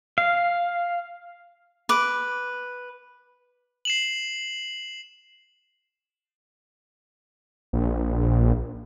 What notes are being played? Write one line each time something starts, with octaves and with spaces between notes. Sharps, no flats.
F5
B4 D6
C7 E7 F#7
A#1